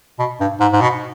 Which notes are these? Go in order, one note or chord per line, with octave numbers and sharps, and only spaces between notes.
B2
G2
G#2
G#2
B2